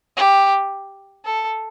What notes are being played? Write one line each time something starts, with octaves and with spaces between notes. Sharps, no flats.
G4
A4